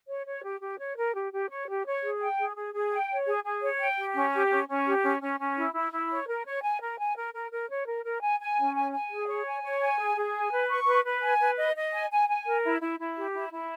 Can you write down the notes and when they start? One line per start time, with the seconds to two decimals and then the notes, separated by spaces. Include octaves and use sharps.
0.08 C#5
0.26 C#5
0.45 G4
0.62 G4
0.79 C#5
0.97 A#4
1.14 G4
1.32 G4
1.50 C#5
1.68 G4
1.85 C#5
2.03 G#4
2.21 G5
2.38 G#4
2.56 G#4
2.73 G#4
2.92 G5
3.09 C#5
3.27 G#4
3.45 G#4
3.62 C#5
3.80 G5
3.98 G4
4.15 C#4
4.33 G4
4.51 C#4
4.68 C#4
4.86 G4
5.03 C#4
5.22 C#4
5.39 C#4
5.57 E4
5.75 E4
5.92 E4
6.10 C#5
6.28 A#4
6.46 C#5
6.63 G#5
6.80 A#4
6.98 G#5
7.16 A#4
7.34 A#4
7.51 A#4
7.70 C#5
7.87 A#4
8.05 A#4
8.22 G#5
8.40 G#5
8.57 C#4
8.75 G#5
8.92 G#5
9.11 G#4
9.28 C#5
9.46 G#5
9.63 C#5
9.81 G#5
9.99 G#4
10.17 G#4
10.34 G#5
10.52 B4
10.69 C#6
10.87 B4
11.05 B4
11.22 G#5
11.40 B4
11.58 D#5
11.76 D#5
11.93 G#5
12.11 G#5
12.28 G#5
12.47 A#4
12.64 E4
12.82 E4
13.00 E4
13.17 G4
13.34 E4
13.53 E4